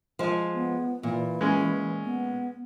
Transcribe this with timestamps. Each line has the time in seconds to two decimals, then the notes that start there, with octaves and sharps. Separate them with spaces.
0.19 F3 G#3
0.54 B3
1.03 A#2 E3
1.41 G#3 C#4
2.05 B3